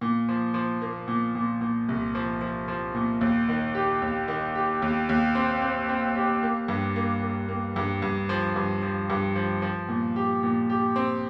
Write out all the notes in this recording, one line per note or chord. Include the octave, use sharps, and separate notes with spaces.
A#2
F3
F3
A#3
A#2
A#2
A#2
C2
F3
F3
F3
A#2
D#2
D#3
G4
D#2
D#3
G4
D#2
D#2
C4
C4
C4
G4
A#3
G2
A#3
A#3
A#3
G2
G2
F3
G2
F3
G2
F3
F3
A#2
G4
A#2
G4
C4